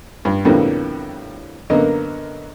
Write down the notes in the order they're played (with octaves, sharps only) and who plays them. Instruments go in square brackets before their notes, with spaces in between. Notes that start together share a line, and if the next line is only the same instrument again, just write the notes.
[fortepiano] G2
F2 A2 D3 G3 A#3 B3
F#2 D3 A#3 B3 A#4 D#5